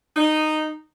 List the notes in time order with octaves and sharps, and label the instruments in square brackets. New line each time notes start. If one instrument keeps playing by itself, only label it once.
[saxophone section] D#4